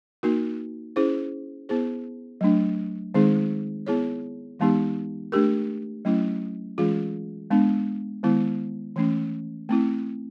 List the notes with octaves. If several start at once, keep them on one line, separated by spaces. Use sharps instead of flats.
A#3 D#4 F#4 A#4
C#4 E4 G#4 C5
B3 E4 G#4 C5
F#3 A3 D4
D#3 G#3 C4 D#4 G#4
B3 E4 G#4 C#5
E3 G#3 B3 D#4 G4
A3 D4 G4 A#4
F#3 A3 C#4 E4
E3 G#3 C#4 F4 G#4
G#3 B3 D4
D#3 G#3 B3 E4
E3 A3 C#4
A3 C4 E4